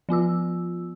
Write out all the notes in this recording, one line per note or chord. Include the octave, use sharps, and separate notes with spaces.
F3 B3 F4 E6